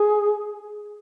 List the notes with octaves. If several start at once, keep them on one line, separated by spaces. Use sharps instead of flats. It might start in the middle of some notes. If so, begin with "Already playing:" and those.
Already playing: G#4